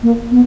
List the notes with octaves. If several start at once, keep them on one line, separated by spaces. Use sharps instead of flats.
A#3
B3